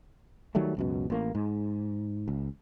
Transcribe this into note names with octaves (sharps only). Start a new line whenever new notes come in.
D#3 F#3 G3 A3
C#2 F#2 B2
A1 A#3
G#2
C#2